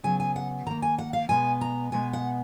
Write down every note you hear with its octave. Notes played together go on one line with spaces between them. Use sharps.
C#3 F#3 B3 G#5
G#5
F#5
D#3 A#3 A#5
G#5
F#5
F5
B2 G#3 B3 G#5
A#5
B2 G#3 B3 G#5
F#5